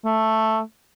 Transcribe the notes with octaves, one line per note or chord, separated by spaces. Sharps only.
A3